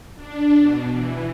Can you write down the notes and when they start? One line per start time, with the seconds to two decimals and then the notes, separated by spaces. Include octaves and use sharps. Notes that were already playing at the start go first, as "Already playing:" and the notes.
0.16 D4
0.59 B2
0.90 E3